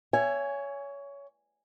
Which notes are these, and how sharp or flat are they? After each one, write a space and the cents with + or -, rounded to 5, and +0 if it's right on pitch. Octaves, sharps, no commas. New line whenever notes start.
C#5 +20 E5 +30 G#5 +0